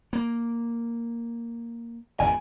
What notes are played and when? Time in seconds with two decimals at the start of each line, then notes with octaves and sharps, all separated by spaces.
0.13 A#3
2.20 G#1 E2 C#3 G#5